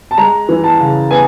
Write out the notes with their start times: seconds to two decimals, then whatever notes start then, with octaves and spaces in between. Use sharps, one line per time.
0.11 A5
0.18 G#3 A#5
0.49 E3
0.64 A5
0.80 C#3
1.11 B3 G#5